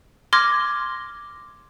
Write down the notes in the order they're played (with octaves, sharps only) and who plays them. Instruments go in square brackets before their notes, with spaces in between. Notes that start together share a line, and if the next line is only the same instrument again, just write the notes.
[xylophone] C6 D6 F6 G#6 A#6